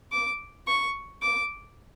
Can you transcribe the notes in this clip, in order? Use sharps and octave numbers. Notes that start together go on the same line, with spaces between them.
D6
C#6
D6